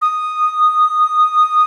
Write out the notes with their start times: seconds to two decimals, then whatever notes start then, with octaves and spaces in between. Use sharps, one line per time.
0.02 D#6